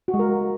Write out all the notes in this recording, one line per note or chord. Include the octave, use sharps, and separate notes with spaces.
F#4
G#3
A#4